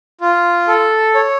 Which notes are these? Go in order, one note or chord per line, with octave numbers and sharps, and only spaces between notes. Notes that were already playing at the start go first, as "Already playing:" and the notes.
F4
A4
C#5